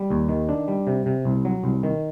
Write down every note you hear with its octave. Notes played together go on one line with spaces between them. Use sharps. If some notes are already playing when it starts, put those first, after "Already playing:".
Already playing: G3
D#2
D#3
D4
G3
C3
C3
C2
F#3
C2
D#3